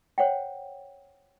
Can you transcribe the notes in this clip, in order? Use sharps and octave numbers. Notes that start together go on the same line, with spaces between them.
C5 C#5 F#5 G5